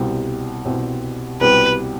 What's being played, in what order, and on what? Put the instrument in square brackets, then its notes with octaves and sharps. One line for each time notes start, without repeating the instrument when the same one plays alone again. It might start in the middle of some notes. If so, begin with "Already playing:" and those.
Already playing: [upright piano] C2 B2 G3 C4 G4
C2 B2 G3 C4 G4
[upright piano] C2 B2 G3 C4 G4 [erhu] B4